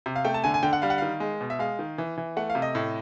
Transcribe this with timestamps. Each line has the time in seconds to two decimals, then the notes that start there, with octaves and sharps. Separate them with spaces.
0.06 C3
0.16 F5
0.25 A3 G5
0.34 A5
0.44 D3 G#5
0.54 G#5
0.63 D3 G5
0.73 F#5
0.82 G3 F5
0.90 F#5
0.98 D#3 F5
1.20 G#3
1.41 B2
1.50 E5
1.59 G#3 F5
1.79 D#3
1.98 E3
2.18 E3
2.37 A3 F#5
2.50 F5
2.55 C3
2.62 D#5
2.75 A2